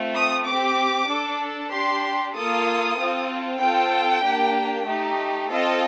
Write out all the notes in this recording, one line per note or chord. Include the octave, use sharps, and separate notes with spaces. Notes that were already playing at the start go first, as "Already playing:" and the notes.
Already playing: A3 C4 F4
D#6
C4 G4 D6
D4 A4
D4 G4 C6
A#3 F4 A4 D#6
C4 F4 A4
C4 F4 A4 G5
A#3 D4 G4
A3 D#4 G4
C4 F4 A4 D#5